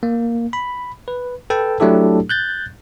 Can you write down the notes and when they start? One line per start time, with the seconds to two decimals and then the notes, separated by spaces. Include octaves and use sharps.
0.03 A#3
0.53 B5
1.08 B4
1.50 A4 B4 G5 A5
1.80 F#3 A3 D4 E4 G4 A4
2.29 F#6 G6 A6